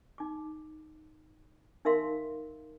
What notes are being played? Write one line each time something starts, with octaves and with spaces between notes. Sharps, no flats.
D#4 D6
D#4 A#4 E5 F5 C6